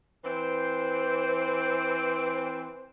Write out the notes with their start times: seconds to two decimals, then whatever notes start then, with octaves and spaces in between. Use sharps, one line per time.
0.24 E3 C4 C5